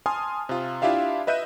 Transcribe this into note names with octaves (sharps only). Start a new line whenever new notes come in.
G#5 A5 C6 D#6 F6
C3 F4
D4 E4 F4 G4 E5 F5
B4 D#5 E5 F#6 G6 D#7